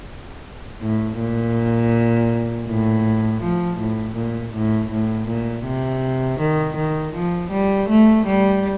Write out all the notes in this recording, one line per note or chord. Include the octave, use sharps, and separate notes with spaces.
A2
A#2
A2
F3
A2
A#2
A2
A2
A#2
C3
D#3
D#3
F3
G3
A3
G3